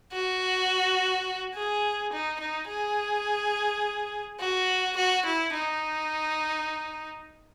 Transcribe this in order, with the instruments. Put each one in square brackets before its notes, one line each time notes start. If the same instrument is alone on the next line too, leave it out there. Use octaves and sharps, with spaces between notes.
[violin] F#4
G#4
D#4
D#4
G#4
F#4
F#4
E4
D#4